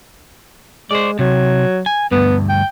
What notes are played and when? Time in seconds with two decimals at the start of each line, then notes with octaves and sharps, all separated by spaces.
0.91 G#3 C5 D5
1.19 C3 F#3
1.86 G#5
2.12 D2 G2 B3
2.49 G5